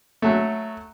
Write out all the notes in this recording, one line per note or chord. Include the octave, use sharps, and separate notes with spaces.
F#3 A3